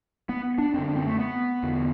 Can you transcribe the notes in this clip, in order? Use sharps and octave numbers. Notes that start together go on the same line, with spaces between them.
B3
D4
F#2 D3 C4
D4
C4
A3
B3
E2 D3